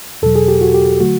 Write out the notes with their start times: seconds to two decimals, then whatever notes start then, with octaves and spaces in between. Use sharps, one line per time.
0.22 E2 B2 F#3 A4
0.35 G#4
0.48 G4
0.61 F#4
0.74 G4
1.00 D3 F#3 A3 F#4